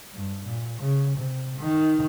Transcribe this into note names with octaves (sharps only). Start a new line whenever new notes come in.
G2
A#2
C#3
C3
D#3